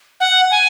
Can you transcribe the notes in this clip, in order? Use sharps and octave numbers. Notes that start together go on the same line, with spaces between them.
F#5
G#5